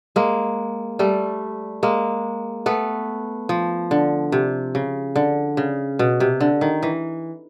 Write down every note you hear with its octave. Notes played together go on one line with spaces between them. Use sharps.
G#3 A#3
G3 A3
G#3 A#3
A3 B3
F3
D3
C3
C#3
D3
C#3
B2
C3
D3
D#3
E3